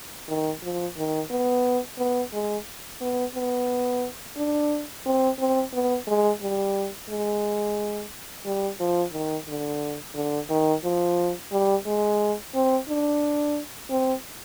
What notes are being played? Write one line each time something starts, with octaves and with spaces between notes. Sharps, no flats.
D#3
F3
D#3
B3
B3
G#3
B3
B3
D4
C4
C4
B3
G#3
G3
G#3
G3
F3
D#3
D3
D3
D#3
F3
G3
G#3
C4
D4
C4